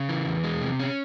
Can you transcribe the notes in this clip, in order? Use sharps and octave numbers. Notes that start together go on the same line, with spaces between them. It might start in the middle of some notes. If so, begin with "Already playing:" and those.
Already playing: C#3
E3
E2
G#3
C3
C#4